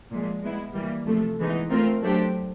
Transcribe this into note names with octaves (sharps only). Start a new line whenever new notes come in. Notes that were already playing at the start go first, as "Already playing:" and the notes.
A#2 F3 G#3
G#3 B3 E4
E3 G3 A#3
C3 F3 A3
E3 G#3 B3 D#4
A3 C4 F4 A#4
F#3 A3 D4 G4 C5